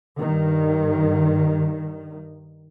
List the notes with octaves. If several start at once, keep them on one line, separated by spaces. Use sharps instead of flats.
G2 D#3